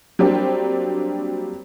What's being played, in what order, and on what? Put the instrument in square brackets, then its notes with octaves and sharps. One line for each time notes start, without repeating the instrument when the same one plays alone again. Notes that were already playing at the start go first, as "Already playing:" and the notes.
[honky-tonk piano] F#3 G3 A#3 C4 D4 G4